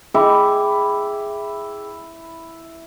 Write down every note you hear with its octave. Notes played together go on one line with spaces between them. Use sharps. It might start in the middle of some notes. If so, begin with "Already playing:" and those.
E4 G#4 G5 D6